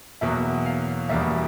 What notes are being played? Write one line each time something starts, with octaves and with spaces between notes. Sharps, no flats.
E2 B2 F#3 A#3 E5
F5
E1 E2 B2 G3 A#3 E5